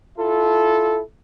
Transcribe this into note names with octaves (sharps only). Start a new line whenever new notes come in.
E4 F4 A4